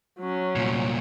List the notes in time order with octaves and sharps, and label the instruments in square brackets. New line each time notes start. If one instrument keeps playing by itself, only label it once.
[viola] F#3 C#4
[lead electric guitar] C2 A#2